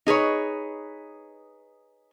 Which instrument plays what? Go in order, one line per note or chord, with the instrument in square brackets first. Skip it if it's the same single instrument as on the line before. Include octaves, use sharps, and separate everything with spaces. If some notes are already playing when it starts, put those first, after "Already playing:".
[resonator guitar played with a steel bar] D#4 G#4 B4 C#5